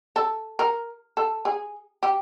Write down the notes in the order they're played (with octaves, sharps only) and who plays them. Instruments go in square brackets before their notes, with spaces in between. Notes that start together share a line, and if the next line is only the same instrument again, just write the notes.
[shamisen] A4
A#4
A4
G#4
G4